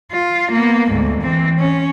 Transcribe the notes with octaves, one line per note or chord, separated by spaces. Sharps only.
F4
A#3 B3
D2 G#2
E3 C4
C#4